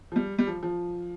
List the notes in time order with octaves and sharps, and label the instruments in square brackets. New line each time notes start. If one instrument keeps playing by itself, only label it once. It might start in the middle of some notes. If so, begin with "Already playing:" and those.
[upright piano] F3
G3
G3
F3
F3